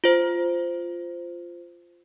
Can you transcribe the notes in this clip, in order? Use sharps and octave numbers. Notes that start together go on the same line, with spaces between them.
F4 C5